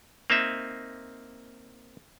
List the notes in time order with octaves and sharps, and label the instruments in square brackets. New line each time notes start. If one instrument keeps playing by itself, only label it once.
[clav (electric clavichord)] A#3 C4 D#4 E5